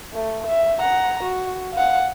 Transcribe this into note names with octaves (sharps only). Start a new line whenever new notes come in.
A3
E5
F#5 A#5
F#4
F5 F#5